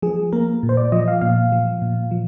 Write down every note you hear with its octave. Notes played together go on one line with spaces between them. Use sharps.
F3 G#4
A#3 A#4
A#2
C5
D5
F3 D#5
F5
A#2 F5
F3
A#2
F3